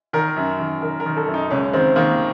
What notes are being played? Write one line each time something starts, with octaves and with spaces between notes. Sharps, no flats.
D#3 A#4
F#2
D#3
D#3 A#4
A#4
D#3
A4
F#2
D#4
C#2 C#4
D#3 C4
D#3 A#3